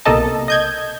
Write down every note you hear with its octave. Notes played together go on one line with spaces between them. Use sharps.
B1 C3 A#3 A4 D#5 A5
D#5 G6 G#6